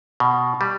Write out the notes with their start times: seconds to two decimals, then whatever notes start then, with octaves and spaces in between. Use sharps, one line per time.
0.20 B2
0.61 G3